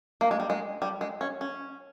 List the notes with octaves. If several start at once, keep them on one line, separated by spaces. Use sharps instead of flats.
A#3
G#3
G3
G#3
G3
G#3
C#4
C#4